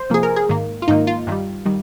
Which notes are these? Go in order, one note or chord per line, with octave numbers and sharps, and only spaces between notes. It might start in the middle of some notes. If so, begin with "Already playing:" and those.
Already playing: C5
C3 F3 A#3 G#4
A#4
G#4
G#2 D#3 A#3
F4
G#2 D#3 A#3 D#4
F4
G2 D#3 G3
D#3 G3